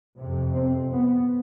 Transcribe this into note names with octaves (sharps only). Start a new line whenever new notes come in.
F2 C3
C4
B3